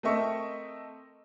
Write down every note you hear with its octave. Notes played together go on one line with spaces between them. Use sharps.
A3 C4 A#4 D#5 E5 C#6